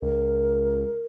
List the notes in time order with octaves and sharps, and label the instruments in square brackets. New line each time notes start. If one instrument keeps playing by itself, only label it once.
[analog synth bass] C#2 [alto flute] A#4